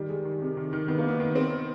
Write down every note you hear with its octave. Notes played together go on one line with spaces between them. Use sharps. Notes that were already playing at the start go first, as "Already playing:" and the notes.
Already playing: D#3 G3
G#3
D#3
C3
D#3
D#3
D#3 B3
A#3
C3 B3
D#3
C4